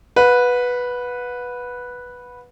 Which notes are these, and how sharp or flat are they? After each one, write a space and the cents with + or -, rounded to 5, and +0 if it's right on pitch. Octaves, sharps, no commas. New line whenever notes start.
B4 -5 F#5 -35